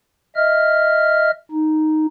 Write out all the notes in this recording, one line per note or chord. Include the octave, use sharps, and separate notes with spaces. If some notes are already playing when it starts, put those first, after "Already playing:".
D#5 E5 F6
D#4